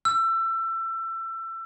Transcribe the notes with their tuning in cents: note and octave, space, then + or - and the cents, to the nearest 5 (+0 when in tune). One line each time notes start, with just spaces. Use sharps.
E6 +25